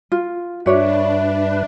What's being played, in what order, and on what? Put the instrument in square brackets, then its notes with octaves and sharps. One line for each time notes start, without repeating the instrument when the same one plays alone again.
[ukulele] F4
[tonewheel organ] G2 B4 [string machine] D4 [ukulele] F#4 C#5 D5 [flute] E5